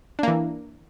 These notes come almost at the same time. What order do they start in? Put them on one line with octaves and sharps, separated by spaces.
D4 A#3 E3